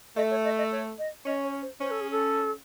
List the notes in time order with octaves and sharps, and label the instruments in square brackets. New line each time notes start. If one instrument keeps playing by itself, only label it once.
[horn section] A3 [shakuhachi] D#5
[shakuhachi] C#5
D#5
D#5
C#5
D#5
[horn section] C#4 [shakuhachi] D#5
[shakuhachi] C#5
C5
[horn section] C#4 [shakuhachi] C5
[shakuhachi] A4
G#4
A4